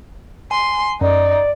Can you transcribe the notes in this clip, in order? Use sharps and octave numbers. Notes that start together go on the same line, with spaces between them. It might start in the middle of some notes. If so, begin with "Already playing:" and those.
G#5 C6
F#2 D#4 D5